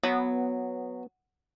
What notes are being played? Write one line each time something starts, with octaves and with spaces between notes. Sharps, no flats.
F#3 B3